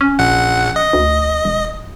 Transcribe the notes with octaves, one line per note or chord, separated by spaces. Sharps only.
C#4
A#1 F#5
D#5
D2
E1